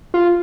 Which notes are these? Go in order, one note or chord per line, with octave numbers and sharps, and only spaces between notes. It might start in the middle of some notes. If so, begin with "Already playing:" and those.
F4